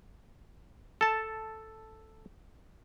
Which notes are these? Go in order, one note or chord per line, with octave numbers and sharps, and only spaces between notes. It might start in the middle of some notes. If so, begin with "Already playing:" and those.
A4 A5